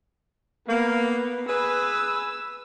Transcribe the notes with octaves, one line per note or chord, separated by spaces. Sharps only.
A#3 B3
G#4 B4 E6